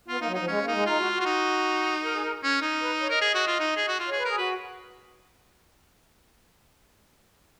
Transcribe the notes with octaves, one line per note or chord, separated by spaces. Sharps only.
B3 F4
A#3 D#4
F#3
F3 D#4
G#3 C#4
A#3
D#4
G#3
D#4 F4
F#4
F#4
F4
D#4
A#4
G#4
A#4
C#4
D#4
B4
C#5
A#4 D#5
G#4
F#4
F4
D#4
G#4
F#4
F4
C#5
G#4
B4
G#4 A#4
F#4 B4